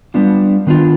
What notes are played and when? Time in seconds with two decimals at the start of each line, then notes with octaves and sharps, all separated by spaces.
0.14 G3 B3 D4 F4
0.67 D#3 B3 D4 F4